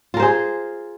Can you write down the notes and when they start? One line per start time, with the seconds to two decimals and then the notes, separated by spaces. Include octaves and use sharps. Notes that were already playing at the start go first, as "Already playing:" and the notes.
0.14 F4
0.17 A#4
0.20 C5
0.23 G#4